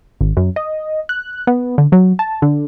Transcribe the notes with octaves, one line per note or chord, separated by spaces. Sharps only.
G#1
F#2
D#5
F#6
B3
D3
F#3
A5
D3